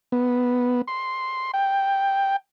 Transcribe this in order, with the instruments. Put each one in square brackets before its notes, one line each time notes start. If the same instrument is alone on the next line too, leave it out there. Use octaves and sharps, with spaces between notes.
[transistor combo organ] B3
C6
G5